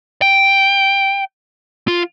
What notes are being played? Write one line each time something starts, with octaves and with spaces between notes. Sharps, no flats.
G5
F4